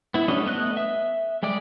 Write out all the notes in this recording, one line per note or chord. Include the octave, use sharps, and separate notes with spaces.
B3 E4
G3 A3 C#4 D4 D#5
A3 B3 D#5 F#6
E5
G3 G#3 G4 D5